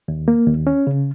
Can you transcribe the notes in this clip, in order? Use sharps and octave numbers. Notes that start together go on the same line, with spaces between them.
D#2
A#3
D#2
C#4
C#3